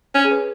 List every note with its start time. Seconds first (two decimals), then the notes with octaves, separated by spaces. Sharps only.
0.15 C#4 C#5
0.24 G#4
0.31 B4